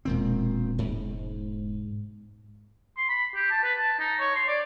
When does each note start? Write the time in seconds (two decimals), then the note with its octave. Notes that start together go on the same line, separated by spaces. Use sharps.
0.05 E1 A#2 D#3 C4
0.78 G#2
2.97 C6
3.09 B5
3.35 G4
3.51 A5
3.64 B4
3.78 A5
3.99 D#4
4.20 C#5
4.35 C6
4.48 D5